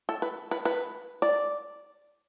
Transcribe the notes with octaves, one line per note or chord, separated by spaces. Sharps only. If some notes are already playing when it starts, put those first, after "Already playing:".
A4
B4
B4
B4
D5